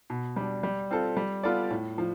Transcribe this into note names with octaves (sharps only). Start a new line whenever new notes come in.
B2
G3 D4
G3
C4 F4 A4
G3
B3 F4 A4 D5
A2
F3